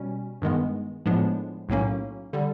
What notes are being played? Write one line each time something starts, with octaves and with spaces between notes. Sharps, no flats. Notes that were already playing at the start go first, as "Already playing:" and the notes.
Already playing: B2 G3 C#4
G2 D#3 G#3 B3
A2 F3 G#3 B3 D4
B1 A2 F#3 A#3 C#4
D3 G3